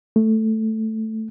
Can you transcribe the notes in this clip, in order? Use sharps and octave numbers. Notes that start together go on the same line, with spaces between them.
A3